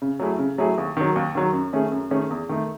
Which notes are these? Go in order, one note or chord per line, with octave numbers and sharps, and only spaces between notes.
C#3
F#3 A3 E4 G#4
C#3
F#3 A3 E4 G#4
D#2
D#3 F#3
D#2
D#3 F#3
F#2
D#3 A3 C#4 G#4
F#2
D#3 A3 C#4 G#4
E2
D#3 A3